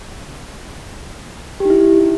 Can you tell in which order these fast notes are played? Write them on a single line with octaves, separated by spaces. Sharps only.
G4 D#4 E4